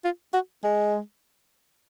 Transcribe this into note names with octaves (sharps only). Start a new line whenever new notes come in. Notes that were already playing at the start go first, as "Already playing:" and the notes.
F4
F#4
G#3